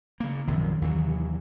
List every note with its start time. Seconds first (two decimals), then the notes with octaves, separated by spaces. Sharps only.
0.20 C#3 A#3
0.47 A#1 F#2 C3 D#3
0.82 D#2 E3 F#3